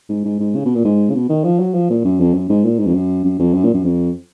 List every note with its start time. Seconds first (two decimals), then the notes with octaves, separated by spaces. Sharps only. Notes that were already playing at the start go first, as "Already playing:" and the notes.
0.09 G#2
0.25 G#2
0.40 G#2
0.56 C#3
0.65 B2
0.75 A#2
0.85 G#2
1.10 C#3
1.15 B2
1.29 D#3
1.44 F3
1.59 F#3
1.74 F3
1.90 A#2
2.05 F#2
2.20 F2
2.34 F#2
2.49 G#2
2.64 A#2
2.79 G#2
2.87 F2
2.94 F#2
3.25 F#2
3.39 F2
3.54 F#2
3.64 A#2
3.74 F#2
3.84 F2